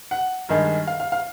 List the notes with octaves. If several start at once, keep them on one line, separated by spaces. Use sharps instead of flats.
F#5
G2 D#3 G#3
F5
F5
F5